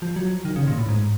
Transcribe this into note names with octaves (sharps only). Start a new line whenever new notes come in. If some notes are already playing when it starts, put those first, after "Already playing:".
F3
F#3
D#3
C#3
A#2
A2
G#2